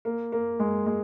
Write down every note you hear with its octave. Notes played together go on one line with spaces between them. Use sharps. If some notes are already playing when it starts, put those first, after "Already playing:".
A#3
A#3
G#3
G#3